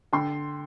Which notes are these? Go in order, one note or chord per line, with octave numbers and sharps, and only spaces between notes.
D3 G5 C6